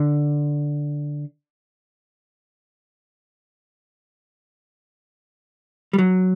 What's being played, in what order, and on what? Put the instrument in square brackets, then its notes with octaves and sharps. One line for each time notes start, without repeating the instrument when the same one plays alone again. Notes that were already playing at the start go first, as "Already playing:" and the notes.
Already playing: [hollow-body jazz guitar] D3
G3
F#3